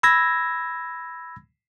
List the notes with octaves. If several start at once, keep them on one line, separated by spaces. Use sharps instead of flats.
B5 E6 G#6 A#6